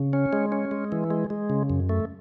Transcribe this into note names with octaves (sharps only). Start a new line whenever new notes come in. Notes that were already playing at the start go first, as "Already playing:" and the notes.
Already playing: C#3
C#4
G#3
C#4
G#3
E3
G#3
G#3
C#3
F#2
A3